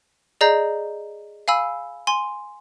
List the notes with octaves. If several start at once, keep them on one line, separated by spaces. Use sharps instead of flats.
G#4 D5 D#5 A#5 G6 C7
F5 G#5 B5 E6
G#5 C6